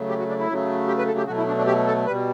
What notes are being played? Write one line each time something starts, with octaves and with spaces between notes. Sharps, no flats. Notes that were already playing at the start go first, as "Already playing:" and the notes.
Already playing: C#3 F#3 A3
G4
F#4
D4
E4
C#3 F#3 A3
G4
B4
A4
G4
B2 F#3 A3 F#4
E4
D4
D4
G4
A4
B2 G3 B4